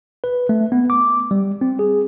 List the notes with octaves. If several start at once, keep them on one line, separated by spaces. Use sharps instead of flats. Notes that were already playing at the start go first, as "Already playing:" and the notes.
B4
A3
B3
D6
G3
C4
G#4